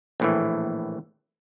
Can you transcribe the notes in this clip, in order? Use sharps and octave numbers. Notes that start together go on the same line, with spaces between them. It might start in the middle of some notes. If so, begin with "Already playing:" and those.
A#1 A2 E3